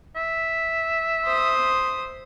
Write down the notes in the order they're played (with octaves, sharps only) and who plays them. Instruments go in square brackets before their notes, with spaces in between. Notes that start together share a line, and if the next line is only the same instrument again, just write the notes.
[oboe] E5
[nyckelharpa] C5 D#6